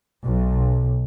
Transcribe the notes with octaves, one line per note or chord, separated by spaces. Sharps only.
B1